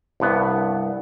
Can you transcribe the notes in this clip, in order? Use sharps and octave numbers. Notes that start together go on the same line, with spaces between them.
C2 G2 B3